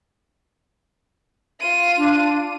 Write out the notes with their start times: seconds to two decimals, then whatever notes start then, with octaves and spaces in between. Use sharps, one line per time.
1.60 F4 D#7
1.98 D4